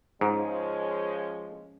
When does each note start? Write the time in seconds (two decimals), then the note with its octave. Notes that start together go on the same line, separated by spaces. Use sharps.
0.21 G#2 F3 G#3 C#4